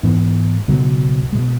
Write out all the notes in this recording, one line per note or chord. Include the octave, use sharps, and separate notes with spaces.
G#2 E3 B3
C#2 B2 F#3
B2 G#3